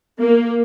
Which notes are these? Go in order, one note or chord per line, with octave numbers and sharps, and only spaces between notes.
A#3